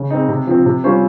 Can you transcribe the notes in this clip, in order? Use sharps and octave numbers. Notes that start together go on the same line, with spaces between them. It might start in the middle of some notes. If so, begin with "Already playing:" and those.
Already playing: C#3
G#3 C4 D#4
C3
F3 C4
C3
G3 C#4 F4 C5